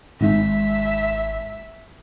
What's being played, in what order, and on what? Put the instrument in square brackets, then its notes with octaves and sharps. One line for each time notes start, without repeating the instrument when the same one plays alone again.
[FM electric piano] G#1 G#2 [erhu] E5